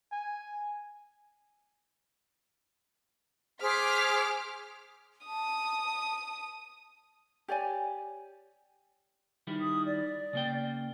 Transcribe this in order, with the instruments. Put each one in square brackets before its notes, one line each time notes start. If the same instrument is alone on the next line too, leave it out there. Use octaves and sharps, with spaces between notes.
[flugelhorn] G#5
[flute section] G#4 C5 D#6 [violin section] D6 F6 B6
[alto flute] A5 [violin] D#6
[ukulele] G4 C#5 D5 G#5
[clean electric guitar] D#3 G3 E4
[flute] D#6
D5
[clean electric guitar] C#3 A#3 G5